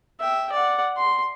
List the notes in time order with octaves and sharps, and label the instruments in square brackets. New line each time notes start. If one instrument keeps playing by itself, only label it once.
[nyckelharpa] E5 G5
D5 F#5
C6